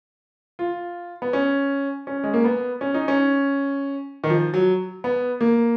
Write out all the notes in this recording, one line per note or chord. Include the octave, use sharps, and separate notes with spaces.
F4
B3
C#4
C#4
G#3
A#3
B3
C#4
D#4
C#4
D#3
F3
F#3
B3
A#3